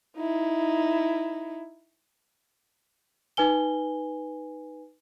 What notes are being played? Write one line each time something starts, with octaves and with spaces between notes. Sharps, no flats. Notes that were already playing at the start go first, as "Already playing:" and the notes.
D#4 E4
D#4 B4 G#5 G7